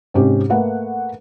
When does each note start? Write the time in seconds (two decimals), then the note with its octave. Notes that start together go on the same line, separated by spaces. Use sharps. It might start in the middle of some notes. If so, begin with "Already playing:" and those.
0.14 G#2 C3 C#4 G4
0.50 A3 A#3 B4 F#5